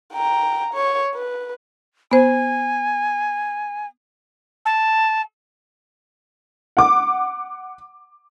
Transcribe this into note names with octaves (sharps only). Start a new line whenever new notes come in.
G5 A#5
C#5
B4
B3 C5 G#5
A5
F#5 D6